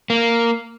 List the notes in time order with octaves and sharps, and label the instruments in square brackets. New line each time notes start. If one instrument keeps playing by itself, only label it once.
[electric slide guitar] A#3